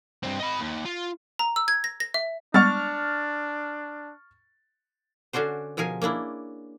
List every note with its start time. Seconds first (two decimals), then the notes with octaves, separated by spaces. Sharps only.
0.23 G2 C4
0.39 D#5 B5
0.60 D#2
0.85 F4
1.39 A#5
1.56 E6
1.68 G#6
1.84 A#6
2.00 A#6
2.14 E5
2.54 G3 G#3 B3 D4 C#6 F6 A6
5.33 D3 C#4 D4 F#4 C5
5.77 B2 F3 G#4 A#4 G#5
6.02 A#3 C#4 D4 E4